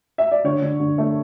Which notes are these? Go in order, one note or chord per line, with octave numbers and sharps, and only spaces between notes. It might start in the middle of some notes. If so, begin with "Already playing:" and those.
E5
D5
D3 C#5
D3
D3
A3